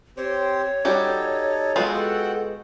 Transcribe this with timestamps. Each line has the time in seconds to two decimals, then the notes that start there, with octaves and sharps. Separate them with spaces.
0.17 C4 G4 C5 C#5
0.85 G3 D#4 F#4 G4 A4
1.76 G#3 B3 F4 F#4 A4 F#5 G5